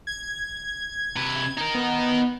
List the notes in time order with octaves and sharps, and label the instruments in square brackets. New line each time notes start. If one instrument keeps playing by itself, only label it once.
[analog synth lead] G#6
[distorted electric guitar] C3 B4
D#4 A#4
[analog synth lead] B3